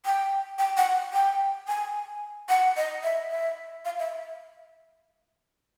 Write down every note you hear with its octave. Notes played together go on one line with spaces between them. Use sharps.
G5
G5
F#5
G5
G#5
F#5
D#5
E5
E5
F5
E5